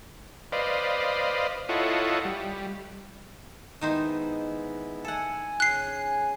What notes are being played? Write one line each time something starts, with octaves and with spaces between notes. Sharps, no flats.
B4 C5 D5 D#5 F5
E4 F4 A4 C#5 D#5 F#5
G3
D#3 G#3 B3 D#4 E4 C5
A4 F#5 G#5
C#3 F#6 C7